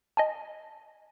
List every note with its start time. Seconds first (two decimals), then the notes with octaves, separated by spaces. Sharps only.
0.17 D#5 G#5 A5